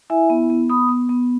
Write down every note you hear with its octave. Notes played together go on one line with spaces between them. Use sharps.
E4 E5 G#5
B3
B3
B3 B5 D#6
B3
B3